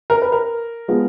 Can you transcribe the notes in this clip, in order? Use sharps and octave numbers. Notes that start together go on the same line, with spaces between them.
A#4
B4
A#4
F3 G#3 B3